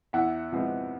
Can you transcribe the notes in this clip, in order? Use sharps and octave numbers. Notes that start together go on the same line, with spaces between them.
E2 E5 F#5
C3 F3 G#3 B3